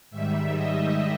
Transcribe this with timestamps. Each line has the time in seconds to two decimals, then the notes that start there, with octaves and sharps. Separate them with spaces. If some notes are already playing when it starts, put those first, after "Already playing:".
0.11 G#2 D#3 G3 E5
0.53 D#5